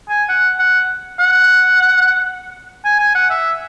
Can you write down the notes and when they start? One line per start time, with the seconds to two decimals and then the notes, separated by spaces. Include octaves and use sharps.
0.09 G#5
0.29 F#5
0.59 F#5
1.20 F#5
2.85 G#5
3.00 G#5
3.15 F#5
3.30 E5